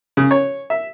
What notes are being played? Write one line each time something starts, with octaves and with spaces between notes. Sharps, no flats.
C#3
C#5
E5